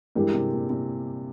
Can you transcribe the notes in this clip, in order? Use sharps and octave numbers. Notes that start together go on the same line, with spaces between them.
G2 E3 G3 G#3 E4 G4 A#4
C3
A#2
C3